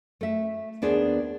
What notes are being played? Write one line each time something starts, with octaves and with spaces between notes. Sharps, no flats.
A3 E5
D#2 B3 D4 G#4 C5